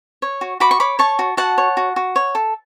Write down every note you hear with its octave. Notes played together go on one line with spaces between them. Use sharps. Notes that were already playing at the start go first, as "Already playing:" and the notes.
C#5
F#4
F#4 B5 D6
C#6
C#5 B5 D6
C#5 A5 C#6
F#4
F#4 F#5 A5
C#5
F#4
F#4
C#5
A4